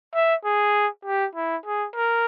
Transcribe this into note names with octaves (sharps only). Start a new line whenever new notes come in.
E5
G#4
G4
E4
G#4
A#4